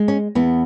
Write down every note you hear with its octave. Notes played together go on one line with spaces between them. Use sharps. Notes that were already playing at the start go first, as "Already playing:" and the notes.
Already playing: G#3
C#4
E2 B3